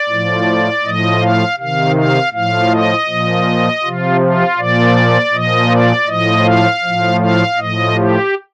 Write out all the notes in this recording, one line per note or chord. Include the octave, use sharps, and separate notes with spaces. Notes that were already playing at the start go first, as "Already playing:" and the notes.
Already playing: D5
A2 F3
A2 F3 D#5
F5
C3 D#3 F5
F5
A2 F3 F5
D#5
A#2 F3
C3 F3 F4
F4
A#2 F3 D5
A#2 F3 D#5
D5
A2 F3 D#5
F5
A2 F3
F5
A2 F3 D#5
G4